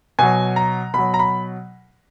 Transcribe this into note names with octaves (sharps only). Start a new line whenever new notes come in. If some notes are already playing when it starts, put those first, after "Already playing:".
B2 F#3 G#5
A#5
B2 F#3 B5
A#5
B5